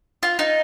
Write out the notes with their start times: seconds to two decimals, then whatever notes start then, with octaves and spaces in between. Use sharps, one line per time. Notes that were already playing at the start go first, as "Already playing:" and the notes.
0.23 F4
0.39 D#4